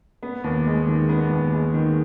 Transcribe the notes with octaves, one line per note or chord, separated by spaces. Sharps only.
B3
D#2
G#3
D#3
B3
D#2
G#3
D#3